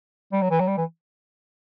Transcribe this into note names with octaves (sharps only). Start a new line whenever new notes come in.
G3
F#3
E3
F#3
G3
E3